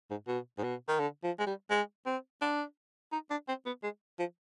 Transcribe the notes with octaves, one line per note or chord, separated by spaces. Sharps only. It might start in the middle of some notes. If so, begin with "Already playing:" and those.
G#2
B2
G#2
B2
D#3
D3
F3
G#3
G3
G#3
C4
D4
D#4
D4
C4
B3
G#3
F3